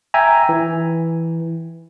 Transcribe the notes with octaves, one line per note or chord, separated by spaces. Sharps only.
E5 G5 G#5 A#5
E3